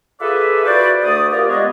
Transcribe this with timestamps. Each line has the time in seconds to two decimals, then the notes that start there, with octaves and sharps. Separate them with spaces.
0.20 F4 G#4 A4 B4 D5 E5
0.64 E4 F#4 B4 C5 D5
1.03 D2 A3 D5 D#6
1.31 F4 G4 A#4 D5
1.49 G3 G#3 B3 D4 C#5 D#5